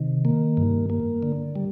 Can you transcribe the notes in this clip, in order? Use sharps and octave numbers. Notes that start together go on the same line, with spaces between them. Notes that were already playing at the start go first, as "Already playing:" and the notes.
Already playing: C3 D#3
A#3
G2
A#3
D3
G3